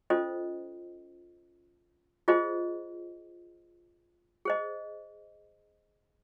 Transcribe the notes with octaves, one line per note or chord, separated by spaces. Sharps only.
C#4 F4 A4 C5 D#5
F4 G#4 C5 D#5
G#4 C5 D#5